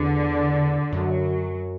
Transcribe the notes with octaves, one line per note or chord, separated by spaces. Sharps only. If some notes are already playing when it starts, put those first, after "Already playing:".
Already playing: E2 D3
F#2 F#3